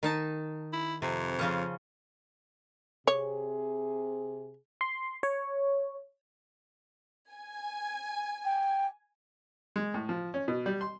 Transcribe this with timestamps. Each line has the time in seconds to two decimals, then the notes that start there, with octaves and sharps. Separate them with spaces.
0.03 D#3 D#4 A5
0.73 E4
1.02 F2 C3
1.39 C#3 F3 C#4
3.07 C3 G#4 C#5
4.81 C6
5.23 C#5
7.32 G#5
8.45 G5
9.76 G#3
9.94 A2
10.09 F3
10.34 C#4
10.48 B2
10.66 G3
10.81 C6